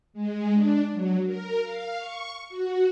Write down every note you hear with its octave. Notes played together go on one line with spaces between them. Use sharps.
G#3
D4
F#3
A#4
F5
C#6
F#4